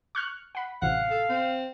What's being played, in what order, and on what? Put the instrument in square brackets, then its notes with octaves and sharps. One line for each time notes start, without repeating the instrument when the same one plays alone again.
[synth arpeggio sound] C#6 F6 F#6
F#5 B5
[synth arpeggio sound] A1 C3 [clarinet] F5 [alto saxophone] F#5
[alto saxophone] A4
C4